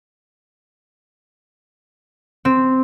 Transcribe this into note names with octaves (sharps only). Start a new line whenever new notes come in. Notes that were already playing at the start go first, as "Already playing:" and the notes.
C4